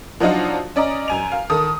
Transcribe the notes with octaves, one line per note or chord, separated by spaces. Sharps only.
F3 F#3 D4 D#4 F4 F#4
C#4 D5 D#5 A#5
F#2 G#5 F7
F5
D#3 A4 D#6